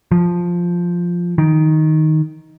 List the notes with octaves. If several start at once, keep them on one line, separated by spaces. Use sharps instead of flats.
F3
D#3